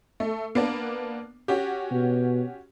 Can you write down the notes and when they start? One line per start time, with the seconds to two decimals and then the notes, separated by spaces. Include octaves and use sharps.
0.20 A3
0.55 A#3 B3 D4
1.48 C#4 F#4 G4
1.91 B2